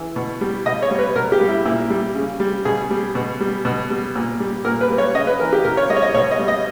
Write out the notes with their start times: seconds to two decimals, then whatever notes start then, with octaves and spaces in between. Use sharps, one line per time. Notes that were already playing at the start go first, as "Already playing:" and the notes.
Already playing: E3
0.16 B2
0.41 G3
0.66 B2 D#5
0.82 C#5
0.91 G3
0.99 B4
1.15 B2 A#4
1.32 G4
1.41 G3
1.49 E4
1.65 A#2 E4
1.90 G3
2.15 C#3
2.40 G3
2.65 B2 G#4
2.91 G3
3.15 B2
3.41 G3
3.65 B2
3.90 G3
4.16 A#2
4.40 G3
4.65 A#2 A#4
4.81 B4
4.89 G3
4.98 C#5
5.14 C#3 D#5
5.27 B4
5.40 E3 A#4
5.53 G4
5.64 B2 A#4
5.77 C#5
5.90 G3 D#5
5.97 C#5
6.02 D#5
6.14 B2 C#5
6.31 D#5
6.39 G3
6.48 D#5